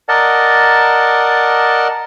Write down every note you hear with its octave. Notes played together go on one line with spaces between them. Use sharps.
A#4 D5 D#5 F#5 A5